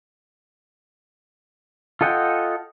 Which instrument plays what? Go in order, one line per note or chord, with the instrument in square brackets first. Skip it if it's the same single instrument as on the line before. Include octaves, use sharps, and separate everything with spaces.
[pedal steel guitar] F4 A4 D#5 F#5 G5